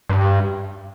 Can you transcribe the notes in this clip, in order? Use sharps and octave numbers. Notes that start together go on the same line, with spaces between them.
G2